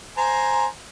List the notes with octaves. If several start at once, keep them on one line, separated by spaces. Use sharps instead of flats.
C5 G#5 A#5